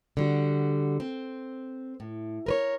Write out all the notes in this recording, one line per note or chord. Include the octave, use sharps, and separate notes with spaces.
D3 G3 F#4
C4
A2
A#4 B4 C#5